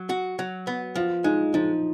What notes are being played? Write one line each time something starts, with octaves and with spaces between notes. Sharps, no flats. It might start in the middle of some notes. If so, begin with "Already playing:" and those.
Already playing: F#3
F#4
F#3
B3
F3 F4
G#3 D#4
F3 D#4